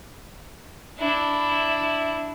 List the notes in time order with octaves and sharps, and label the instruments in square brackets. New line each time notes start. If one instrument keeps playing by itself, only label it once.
[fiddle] D4 E4